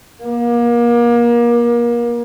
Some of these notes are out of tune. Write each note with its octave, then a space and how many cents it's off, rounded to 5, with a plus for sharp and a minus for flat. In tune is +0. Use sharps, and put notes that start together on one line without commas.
A#3 +30